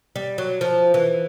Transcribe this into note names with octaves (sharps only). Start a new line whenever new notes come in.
G3
F#3
F3
E3